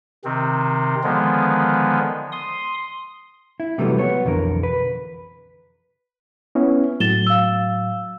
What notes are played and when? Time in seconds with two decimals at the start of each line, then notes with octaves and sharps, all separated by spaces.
0.25 C3 D#3 C4
1.04 D3 D#3 F3 G#3 B3
2.32 C6 D#6
3.60 E4
3.78 C3 E3 F#3 G3 A3 B3
3.98 B3 C#5
4.25 B1 F2 D3 E3 A#4
4.63 B4
6.55 B3 C#4 E4
7.00 A2 F#3 A6 E7 G7
7.27 F5 E6